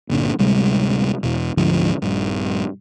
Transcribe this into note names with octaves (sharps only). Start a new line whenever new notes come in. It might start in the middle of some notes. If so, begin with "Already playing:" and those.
G1 A#2 D3
D1 C3 G3 G#3
E2 B2
D2 G#2 D3 F3
A#1 G2